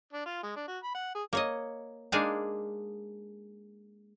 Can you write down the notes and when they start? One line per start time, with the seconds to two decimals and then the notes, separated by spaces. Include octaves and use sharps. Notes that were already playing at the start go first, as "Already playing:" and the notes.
0.13 D4
0.26 F4
0.43 G#3
0.56 D4
0.68 F#4
0.83 B5
0.95 F#5
1.15 G#4
1.33 A#3 C#5 D#5
2.12 G#3 A#3 D4 D#4 G#4 F5